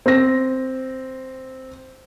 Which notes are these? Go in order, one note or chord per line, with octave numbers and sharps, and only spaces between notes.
C4 A#6